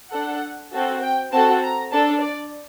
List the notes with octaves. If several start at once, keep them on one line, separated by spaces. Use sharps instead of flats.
D4 A4 F#5
C4 F#4 A4
G5
C4 F#4 A4 A5
A#5
D4 A4 A5
D5